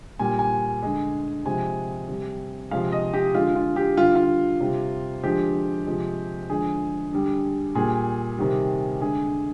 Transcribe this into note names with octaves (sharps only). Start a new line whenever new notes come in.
A#2 G3 G#5
G#5
D3 G#3
C3 F3 G#3 G#5
C3 G3
C3 F3 G#3 F5
D#5
G4
D3 G#3 F4
F4
G4
D3 G3 F4
F4
C3 G3
D3 F3 G#3 G4
C3 F3 G#3
D3 F3 G#3 G#4
D3 G3
A#2 G3 G#4
C3 D#3 G3
D3 G#3 G#4